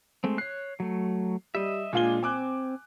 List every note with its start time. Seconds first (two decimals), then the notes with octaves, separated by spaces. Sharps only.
0.24 G#3 A3 C4
0.38 C#5 F#6 C7
0.80 F#3 A3
1.55 G3 D#5 E5
1.93 A#2 G#3 D4 F4 G#5 G7
2.23 C4 G#5 D6 F#6